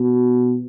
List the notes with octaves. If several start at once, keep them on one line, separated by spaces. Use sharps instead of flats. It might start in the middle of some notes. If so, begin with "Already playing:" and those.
Already playing: B2